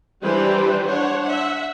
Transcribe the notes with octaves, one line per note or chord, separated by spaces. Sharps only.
E3 G3 D4 G4 B4 C5
D4 C5 C#5 F#5
E5 F#5